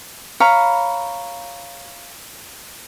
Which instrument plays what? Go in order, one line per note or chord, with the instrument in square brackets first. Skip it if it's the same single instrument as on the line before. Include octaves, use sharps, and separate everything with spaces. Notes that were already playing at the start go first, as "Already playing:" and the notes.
[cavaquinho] C#5 F5 A#5 B5